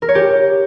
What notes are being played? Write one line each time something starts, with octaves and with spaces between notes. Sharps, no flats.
A#4
C#5
G4